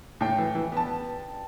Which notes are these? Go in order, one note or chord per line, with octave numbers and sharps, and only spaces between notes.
A2 G5
E3
E3
B3 A5